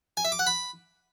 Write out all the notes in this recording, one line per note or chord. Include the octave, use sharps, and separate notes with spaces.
G#5
E5
D6
F#5
B5